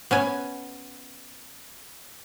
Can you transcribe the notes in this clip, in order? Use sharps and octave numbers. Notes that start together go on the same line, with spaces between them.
B3 C#4 G#5